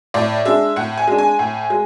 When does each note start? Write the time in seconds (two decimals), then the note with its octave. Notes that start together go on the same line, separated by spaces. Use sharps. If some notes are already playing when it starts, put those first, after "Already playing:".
0.14 A2 D5
0.45 G#3 D4 E5
0.76 A2 F#5
0.97 G#5
1.08 G#3 D4
1.18 G#5
1.39 A2
1.70 G#3